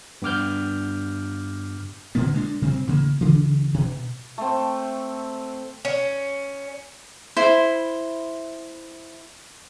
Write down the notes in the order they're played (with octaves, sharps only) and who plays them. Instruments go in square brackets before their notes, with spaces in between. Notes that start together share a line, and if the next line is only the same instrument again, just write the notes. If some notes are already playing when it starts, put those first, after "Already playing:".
[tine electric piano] G2 B3 D6 F6 G6
[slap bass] B2 D3 A#3 B3
G#3 A#3 D4
C3 G3 B3 C4
A1 C#3 F#3 A#3
D2 C#3 E3
B2
[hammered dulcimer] A3 C4
[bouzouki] C#4
[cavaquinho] E4 C5 B5